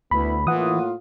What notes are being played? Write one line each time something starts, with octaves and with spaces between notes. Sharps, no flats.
D2 B3 E4 B5
A2 E3 A#3 F4 F#5 D#6